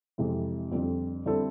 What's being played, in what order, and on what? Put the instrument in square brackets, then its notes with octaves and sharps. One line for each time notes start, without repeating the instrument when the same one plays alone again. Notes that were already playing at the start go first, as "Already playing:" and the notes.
[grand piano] F2 C3 E3 G#3 C4
F2 D3 G3 C4 F4
D3 G3 C4 E4 A4